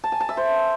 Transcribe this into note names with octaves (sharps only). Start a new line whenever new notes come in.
A5
G#5
A5
E5
C5